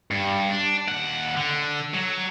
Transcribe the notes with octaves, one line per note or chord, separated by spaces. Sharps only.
G2
D4
D#2 F#5
D3
F#3